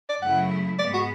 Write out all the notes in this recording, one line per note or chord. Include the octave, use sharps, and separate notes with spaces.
D5
F#2 C#3 F#3 A3 E4 F#5
G#2 G#3 B3 D5
F#4